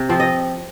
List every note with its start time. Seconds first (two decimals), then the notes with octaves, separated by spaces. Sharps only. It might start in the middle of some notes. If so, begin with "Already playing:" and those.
Already playing: C3
0.09 F3 C4
0.20 D#5